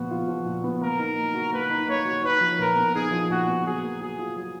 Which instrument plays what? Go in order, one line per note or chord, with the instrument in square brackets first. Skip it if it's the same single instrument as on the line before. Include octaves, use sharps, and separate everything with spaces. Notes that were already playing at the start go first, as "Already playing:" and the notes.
Already playing: [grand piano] A#2 F3 B3 [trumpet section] F#4
[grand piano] F4
F3
A#2
B3
[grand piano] A#3 [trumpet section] A#4
[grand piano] D#4
A#3
F#4
[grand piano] A#3 [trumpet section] B4
[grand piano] D#4
[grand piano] A#3 [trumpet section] C#5
[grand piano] F#4
[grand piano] D#4 [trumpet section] B4
[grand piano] F3
[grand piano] A#2 [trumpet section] A#4
[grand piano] B3
[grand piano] D#4 [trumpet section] G#4
[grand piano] F3
[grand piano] A#2 [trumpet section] F#4
[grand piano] B3
[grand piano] F#3 [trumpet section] G#4
[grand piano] A#3
[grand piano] F#3 [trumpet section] G#4
[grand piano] F4
F#3